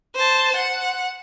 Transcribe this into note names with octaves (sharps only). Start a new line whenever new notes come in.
C5 A5
F#5